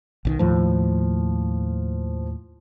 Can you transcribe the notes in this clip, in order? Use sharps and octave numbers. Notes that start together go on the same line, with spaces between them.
B1 D3 D#3
D#2 A2 F3